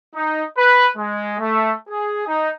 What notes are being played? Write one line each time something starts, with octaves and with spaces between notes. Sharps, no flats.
D#4
B4
G#3
A3
G#4
D#4